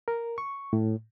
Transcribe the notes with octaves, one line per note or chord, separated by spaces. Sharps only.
A#4
C#6
A2